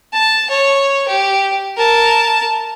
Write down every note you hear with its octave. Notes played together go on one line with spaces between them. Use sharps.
A5
C#5
G4
A#4 A5